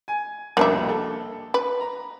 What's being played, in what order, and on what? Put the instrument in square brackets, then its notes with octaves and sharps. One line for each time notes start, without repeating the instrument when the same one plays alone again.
[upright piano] G#5
[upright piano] C2 F2 B2 [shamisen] A#3 D4 E5
[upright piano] A4
[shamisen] B4
[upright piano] A#5